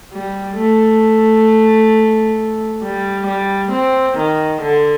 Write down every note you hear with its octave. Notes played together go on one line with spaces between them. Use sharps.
G3
A3
G3
G3
C4
D#3
D3